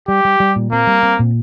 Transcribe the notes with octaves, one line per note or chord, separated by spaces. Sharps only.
G3 G4
G3
G3
A#2
A#3 C4
G3
C4
A#2